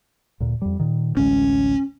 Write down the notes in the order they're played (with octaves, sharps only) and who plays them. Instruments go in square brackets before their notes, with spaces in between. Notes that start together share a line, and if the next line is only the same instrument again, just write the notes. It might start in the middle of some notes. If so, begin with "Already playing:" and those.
[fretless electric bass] D2 A#2
F2 G3
A#2 D#3
[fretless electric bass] A1 D2 G#3 [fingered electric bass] C#4